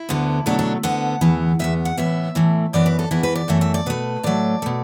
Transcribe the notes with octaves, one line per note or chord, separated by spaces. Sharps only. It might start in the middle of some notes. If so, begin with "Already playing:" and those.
Already playing: E4
D2 D3 B3
B2 F#3 A3 D4
D4
D2 D3 B3 F#5
E2 E3 B3
E2 B2 B3 E5
F#5
A2 E3 B3 E5
A2 E3 A3
F#2 E3 B3 D5
B4
A4
E2 E3 B3 E4
B4
D5
F#2 E3 A3 E5
E5
D5
B2 A3 B4
A2 F#3 A3 D5
B2 A3